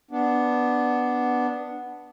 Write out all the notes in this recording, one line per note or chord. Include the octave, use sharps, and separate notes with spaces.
B3 D4